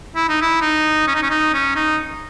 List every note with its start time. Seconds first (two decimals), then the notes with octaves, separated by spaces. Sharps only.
0.16 E4
0.29 D#4
0.41 E4
0.61 D#4
1.07 C#4
1.15 D#4
1.23 C#4
1.30 D#4
1.54 C#4
1.76 D#4